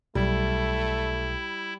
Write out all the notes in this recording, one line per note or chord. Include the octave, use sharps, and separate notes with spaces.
B1 G3 A3 E4